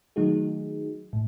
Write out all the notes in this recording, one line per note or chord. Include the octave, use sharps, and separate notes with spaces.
D#3 F#3 A3 D#4 F#4 G#4
A2